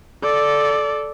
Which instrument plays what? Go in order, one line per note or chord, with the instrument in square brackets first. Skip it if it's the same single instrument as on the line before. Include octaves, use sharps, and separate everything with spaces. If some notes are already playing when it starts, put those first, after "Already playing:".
[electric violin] A4 D5